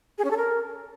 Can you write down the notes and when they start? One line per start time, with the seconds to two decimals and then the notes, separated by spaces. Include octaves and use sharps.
0.18 G#4
0.24 C#4
0.30 A4
0.37 A#4